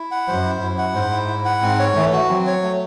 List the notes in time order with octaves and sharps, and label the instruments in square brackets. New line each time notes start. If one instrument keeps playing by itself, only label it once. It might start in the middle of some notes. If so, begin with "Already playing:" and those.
Already playing: [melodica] E4
F#5
[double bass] F#2 [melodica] C5
[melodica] E4
[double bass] F#2 [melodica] E4
[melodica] F#5
[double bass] G#2 [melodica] C5
[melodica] E4
E4
F#5
[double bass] G#2 [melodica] C4
[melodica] C#5
[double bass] E3 [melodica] A3
[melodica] F#4
[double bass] F#3 [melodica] C4
[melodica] C#5
A3